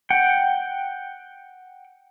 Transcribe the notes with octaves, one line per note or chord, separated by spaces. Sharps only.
F#5 G5